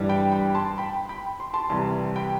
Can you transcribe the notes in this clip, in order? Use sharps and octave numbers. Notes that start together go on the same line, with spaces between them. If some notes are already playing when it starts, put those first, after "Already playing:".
Already playing: G2 E3 G3
G5 B5
G5 B5
A5 C6
G5 B5
G5 B5
C6
A5 C6
C2 C3 E3 G3 A5 C6
G5 B5